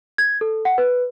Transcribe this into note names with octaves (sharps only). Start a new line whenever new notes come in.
G#6
A4
F#5
B4